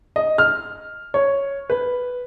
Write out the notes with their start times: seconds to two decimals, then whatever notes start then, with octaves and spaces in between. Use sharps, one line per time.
0.16 D#5
0.38 F6
1.14 C#5
1.70 B4